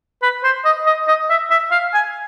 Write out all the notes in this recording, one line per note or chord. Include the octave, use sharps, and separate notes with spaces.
B4
C5
D#5
D#5
D#5
E5
E5
F5
G#5